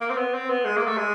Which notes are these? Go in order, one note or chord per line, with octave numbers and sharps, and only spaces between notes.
A#3
C4
B3
C4
B3
G#3
A#3
A3
G#3